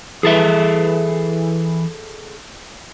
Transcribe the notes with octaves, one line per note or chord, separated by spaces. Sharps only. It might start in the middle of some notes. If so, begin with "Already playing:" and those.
E3 G#4 A4 E5